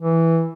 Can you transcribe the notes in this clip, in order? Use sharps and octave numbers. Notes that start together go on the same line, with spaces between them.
E3